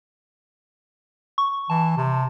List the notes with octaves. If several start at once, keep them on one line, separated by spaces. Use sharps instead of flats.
C#6
E3 A5
C3